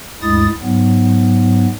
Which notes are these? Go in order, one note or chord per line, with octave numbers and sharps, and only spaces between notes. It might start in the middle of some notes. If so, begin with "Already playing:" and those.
D2 G2 G#3 E4 D#6 A6
G#2 F#3 B3